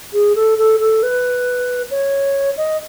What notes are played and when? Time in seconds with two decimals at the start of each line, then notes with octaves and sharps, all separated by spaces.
0.13 G#4
0.35 A4
0.58 A4
0.80 A4
1.03 B4
1.91 C#5
2.57 D#5